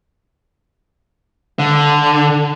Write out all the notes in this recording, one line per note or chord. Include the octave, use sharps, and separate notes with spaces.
D3